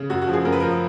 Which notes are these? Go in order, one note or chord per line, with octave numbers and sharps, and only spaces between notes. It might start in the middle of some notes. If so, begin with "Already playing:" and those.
Already playing: C#3
F#2 F#4
F#4
F3
G#4
F#2 A#4
B4
F3 A#4